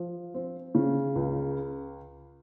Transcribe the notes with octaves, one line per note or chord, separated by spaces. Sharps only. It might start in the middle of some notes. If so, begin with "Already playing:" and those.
Already playing: F3
C4
C#3
C#2